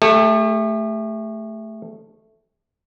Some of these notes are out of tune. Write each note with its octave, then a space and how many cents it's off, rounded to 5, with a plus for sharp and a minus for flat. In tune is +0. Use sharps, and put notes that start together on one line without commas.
A3 +0 G4 +45